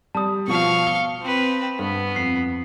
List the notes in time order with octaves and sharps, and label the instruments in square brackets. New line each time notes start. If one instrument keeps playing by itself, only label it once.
[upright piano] G3 [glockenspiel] A5 D#6
[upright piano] B2 F3 [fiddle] F5 C#6
[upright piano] C#7 [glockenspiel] G7
[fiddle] C4 B4
[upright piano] G2 [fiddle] B3
[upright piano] F2 [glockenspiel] C7